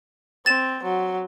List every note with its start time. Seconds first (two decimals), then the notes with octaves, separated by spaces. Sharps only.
0.46 C4 A6 E7
0.83 F#3